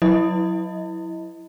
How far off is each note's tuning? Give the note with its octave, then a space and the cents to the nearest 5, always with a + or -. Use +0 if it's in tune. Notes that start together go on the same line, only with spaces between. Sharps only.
F#3 -15 E4 +0 D#5 +20